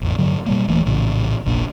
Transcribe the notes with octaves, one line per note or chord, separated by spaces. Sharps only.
A1 F2
G2 D3 F#3
B2 G3 A#3
D#1 E3 A3 A#3
A#1 A2 C#3 E3
F1 A#1 A#2 D4